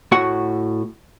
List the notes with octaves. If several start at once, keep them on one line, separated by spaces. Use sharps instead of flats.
A2 F#4 F#5